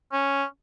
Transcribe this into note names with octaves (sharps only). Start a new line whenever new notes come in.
C#4